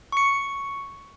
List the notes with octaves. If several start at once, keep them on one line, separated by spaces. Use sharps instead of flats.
C#6 C#7